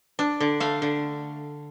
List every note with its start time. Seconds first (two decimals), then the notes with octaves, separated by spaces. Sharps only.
0.19 D4
0.40 D3
0.60 A3 F5
0.82 D3